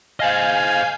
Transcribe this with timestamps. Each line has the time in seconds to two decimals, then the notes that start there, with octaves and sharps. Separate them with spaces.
0.20 C5 D#5 F5 G#5 G6